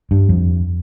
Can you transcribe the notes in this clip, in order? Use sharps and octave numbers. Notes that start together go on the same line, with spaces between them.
G2
F2